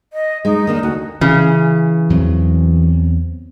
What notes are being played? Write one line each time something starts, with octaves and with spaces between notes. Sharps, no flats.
D#5
G#3 D#4
D#3 A#3 D4
D2 F#4
C#3 E3
E2 F#3 C4